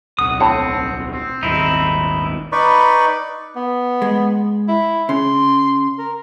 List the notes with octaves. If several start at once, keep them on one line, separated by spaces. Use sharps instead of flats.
D1 B1 F#5 D#6
A2 D3 C4 F#5 D#6
C4
D#1 G#1 D#3 D#4 E4
D#4 B4 D5 B5 C#6
B3
G#3
E4
C#3 C6
A#4